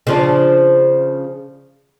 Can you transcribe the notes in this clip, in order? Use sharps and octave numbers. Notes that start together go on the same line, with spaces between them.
C#3 F3 D4